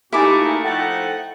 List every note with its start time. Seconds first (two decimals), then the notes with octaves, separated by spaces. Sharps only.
0.13 A#2 A3 D#4 E4 F#4 G4 G#5 D6
0.64 F3 A3 D#4 F#5 G5